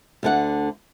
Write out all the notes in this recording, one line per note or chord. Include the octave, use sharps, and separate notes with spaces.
D2 D3 F#5